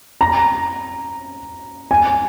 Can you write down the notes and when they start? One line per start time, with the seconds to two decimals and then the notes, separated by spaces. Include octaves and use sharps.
0.21 A#5
1.91 G#5